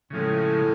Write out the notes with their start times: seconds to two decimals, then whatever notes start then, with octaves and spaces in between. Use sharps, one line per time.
0.10 A2 C#3 F3 G#3